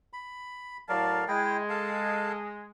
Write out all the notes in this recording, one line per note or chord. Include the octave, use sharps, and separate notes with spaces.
B5
A2 F#3 A#4 D5 F5 A5
G#3 E4 G5
A4 F5 A5